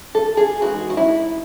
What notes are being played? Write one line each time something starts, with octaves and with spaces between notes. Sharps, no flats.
A4
G#4
E3 G#3 D#4 F#4
F#4
E4